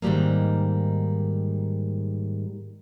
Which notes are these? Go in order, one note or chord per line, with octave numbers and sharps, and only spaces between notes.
G#2 D#3 G3 G#3 A#3